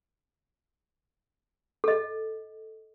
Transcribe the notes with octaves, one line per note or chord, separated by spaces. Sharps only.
A4 D#5